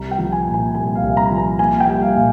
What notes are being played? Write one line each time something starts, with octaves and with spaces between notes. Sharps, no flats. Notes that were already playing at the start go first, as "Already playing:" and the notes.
Already playing: C2 A#5
G5
F3
G#5
A#2
G#5
C2 G#5
F5
C2
A#5
F3
A#5
A#3 G#5
G5
G3
F5
A#2